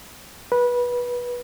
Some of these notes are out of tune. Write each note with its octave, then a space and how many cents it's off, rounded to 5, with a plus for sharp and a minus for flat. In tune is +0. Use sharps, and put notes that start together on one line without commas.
B4 -20